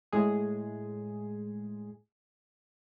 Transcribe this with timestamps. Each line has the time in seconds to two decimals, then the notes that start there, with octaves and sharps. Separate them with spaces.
0.12 A2 G#3 G#4